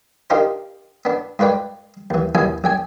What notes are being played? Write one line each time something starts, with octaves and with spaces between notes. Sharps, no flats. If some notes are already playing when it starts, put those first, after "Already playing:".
D4 D#4 F4 G4 A#4 C5
B3 D4
G#2 F4 B4 D5 G5
D#2 E3
A#1 D#2 B2 E4 G#5 D#6
A#1 G5 G#5